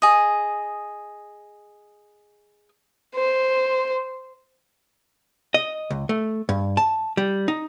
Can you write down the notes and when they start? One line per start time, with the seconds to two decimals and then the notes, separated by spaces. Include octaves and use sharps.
0.02 G#4 D#5
3.15 C5
5.54 D#5
5.90 C#2
6.09 A3
6.49 G2
6.77 A5
7.17 G3
7.48 D#4